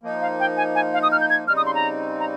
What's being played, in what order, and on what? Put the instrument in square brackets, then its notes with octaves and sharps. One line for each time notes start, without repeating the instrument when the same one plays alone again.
[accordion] F3 A#3 D#4
[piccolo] F5
G5
G#5
G#5
F5
D#6
F6
G6
G#6
[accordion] C#3 G3 C4 D#4 [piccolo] F6
[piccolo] D#6
C6
A#5
A#5